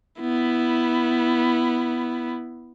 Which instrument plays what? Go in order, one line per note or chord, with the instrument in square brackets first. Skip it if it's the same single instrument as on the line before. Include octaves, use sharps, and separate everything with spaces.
[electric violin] B3 E4